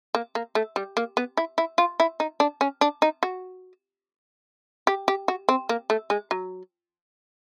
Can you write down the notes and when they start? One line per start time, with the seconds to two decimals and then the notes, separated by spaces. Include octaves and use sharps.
0.15 A#3
0.35 A#3
0.55 A3
0.76 G3
0.97 A#3
1.17 B3
1.37 E4
1.58 E4
1.78 F4
2.00 E4
2.20 D#4
2.40 D4
2.61 C#4
2.81 D4
3.02 D#4
3.23 F#4
4.87 G4
5.08 G4
5.28 F#4
5.49 C4
5.69 A#3
5.90 A3
6.10 G#3
6.31 F#3